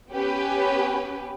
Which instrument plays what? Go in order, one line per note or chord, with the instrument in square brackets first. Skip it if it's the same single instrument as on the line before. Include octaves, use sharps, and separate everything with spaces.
[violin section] B3 C#4 G4 B4